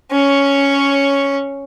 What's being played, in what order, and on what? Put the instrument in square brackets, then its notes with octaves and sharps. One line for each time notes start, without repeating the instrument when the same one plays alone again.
[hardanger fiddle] C#4 C#5